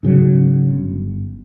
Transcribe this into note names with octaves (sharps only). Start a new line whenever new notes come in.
G#2 C#3 F#3
G1